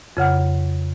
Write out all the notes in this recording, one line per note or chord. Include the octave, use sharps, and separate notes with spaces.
F2 C#3 F#5 F6